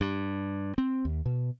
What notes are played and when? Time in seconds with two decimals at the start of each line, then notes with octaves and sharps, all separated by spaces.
0.01 G2
0.78 C4
1.05 D#2
1.26 B2